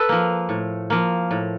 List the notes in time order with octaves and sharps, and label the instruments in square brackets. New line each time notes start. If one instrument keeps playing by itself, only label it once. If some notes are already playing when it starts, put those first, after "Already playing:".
Already playing: [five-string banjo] A4 B4
[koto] F3 A#3
A2
F3 A#3
A2